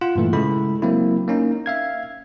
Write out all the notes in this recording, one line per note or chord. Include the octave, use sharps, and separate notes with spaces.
F4 F#5
G2 A#2 E3 A3
C#3 G#3 E4 A4 B5
F#3 A#3 C4 E4
A#3 C#4 D#4
E5 F5 G#6